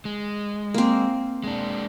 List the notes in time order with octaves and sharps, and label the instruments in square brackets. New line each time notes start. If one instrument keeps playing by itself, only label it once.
[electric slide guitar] G#3
[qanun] A#3 C4
[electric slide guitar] G#3 D4